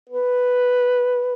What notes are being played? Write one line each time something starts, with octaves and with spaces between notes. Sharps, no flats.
B4